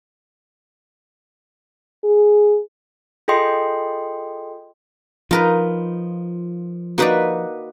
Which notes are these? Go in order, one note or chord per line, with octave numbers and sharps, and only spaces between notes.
G#4
F4 G#4 A4 D#5 G5 C6
F3 D#4 F4 A#4 B4
A#3 D#4 F#4 B4 D5